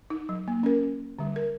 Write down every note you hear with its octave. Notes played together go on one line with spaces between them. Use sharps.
D#4
F#3
A#3
C#4 A#4
D3 G3
A#4